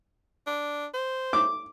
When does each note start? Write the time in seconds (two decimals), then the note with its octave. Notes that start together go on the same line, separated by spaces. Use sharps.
0.47 D4
0.94 C5
1.33 D6